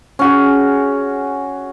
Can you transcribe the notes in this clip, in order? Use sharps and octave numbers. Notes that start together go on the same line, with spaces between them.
C#4 F#4 G#4